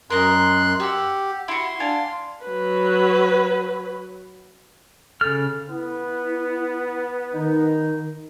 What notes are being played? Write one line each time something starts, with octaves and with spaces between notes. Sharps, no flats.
F#2 A#4 D#5 A#5 C6 F#6
G4 F#5 E6
E4 F#4 C6
D4 F5 G#5
F#3 B4
C#3 A4 F6
B3 E4
D#3 D#4